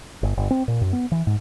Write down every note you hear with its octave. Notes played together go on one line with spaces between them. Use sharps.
G1
G1
C4
A#2
F#2
B3
E3
G#2